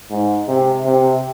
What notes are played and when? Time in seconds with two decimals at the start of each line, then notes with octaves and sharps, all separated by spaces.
0.11 G#2
0.48 C3
0.85 C3